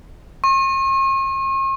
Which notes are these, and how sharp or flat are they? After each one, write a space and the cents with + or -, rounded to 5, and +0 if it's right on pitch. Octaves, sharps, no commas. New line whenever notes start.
C#6 -45